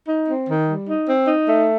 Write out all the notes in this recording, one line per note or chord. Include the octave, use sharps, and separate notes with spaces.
D#4
C4
D#3
G3
D#4
C4
D#4
A3